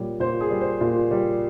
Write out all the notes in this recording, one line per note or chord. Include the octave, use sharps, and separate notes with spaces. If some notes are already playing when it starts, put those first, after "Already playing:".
Already playing: A#2 G3 C#5
A#2 C5
G#4
G3
C5
A#2
G3